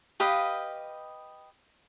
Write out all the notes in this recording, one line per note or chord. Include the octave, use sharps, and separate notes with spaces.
G4 B4 D#5 F5